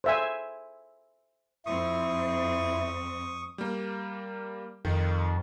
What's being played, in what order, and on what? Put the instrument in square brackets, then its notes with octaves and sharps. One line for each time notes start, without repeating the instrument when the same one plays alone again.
[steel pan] C5 E5 G#5
[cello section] F2 C4 [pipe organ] E4 [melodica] C#6 D#6
[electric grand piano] G3 A#3
[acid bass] F2 [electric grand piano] D#3